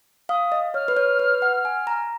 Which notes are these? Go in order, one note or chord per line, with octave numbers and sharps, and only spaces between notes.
F5 D#6
D#5
C#5 F6
B4
C#5
B4
F#5
G#5
A#5